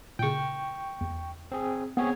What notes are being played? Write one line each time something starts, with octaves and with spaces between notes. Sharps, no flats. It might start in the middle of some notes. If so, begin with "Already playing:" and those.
A#2 C#3 G5 C#6
E2
C4 G#4
B3 C4 G#4 C#5